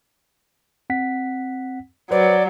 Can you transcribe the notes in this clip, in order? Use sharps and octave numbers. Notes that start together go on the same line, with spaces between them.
C4 F#5 B6
F#3 B4 C5 D5